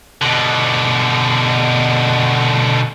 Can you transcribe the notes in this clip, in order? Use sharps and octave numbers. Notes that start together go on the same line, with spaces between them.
B2 D3